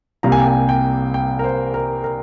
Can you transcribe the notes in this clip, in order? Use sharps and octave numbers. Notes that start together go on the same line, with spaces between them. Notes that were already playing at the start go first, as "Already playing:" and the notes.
C2 C3 G3 A#3 A#5
G#5
G5
G#5
G5
G5
A#4
C5
A#4
A#4